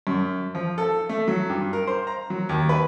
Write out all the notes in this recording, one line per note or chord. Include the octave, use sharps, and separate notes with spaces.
F#2
F3
A4
A3
F#3
G2
A#4
C5
A#5
F#3
D#2
B4